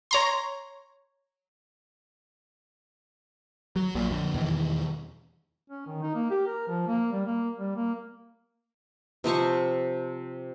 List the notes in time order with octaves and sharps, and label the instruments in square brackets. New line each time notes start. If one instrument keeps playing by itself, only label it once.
[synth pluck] C#5 A#5 C6
[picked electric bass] F#3
A#1 A#2
F2 D3
E2 B2 D#3 E3
[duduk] C#4
D#3
D#4
A#3
G4
A#4
F3
A#3
G3
A#3
G3
A#3
[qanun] C3 F3 C5 C#6